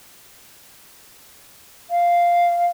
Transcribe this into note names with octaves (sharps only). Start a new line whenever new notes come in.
F5